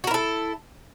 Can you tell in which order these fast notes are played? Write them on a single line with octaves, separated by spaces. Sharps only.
F#4 A#4 E4 A4